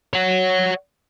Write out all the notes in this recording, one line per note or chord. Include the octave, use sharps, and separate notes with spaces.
C#5 F#5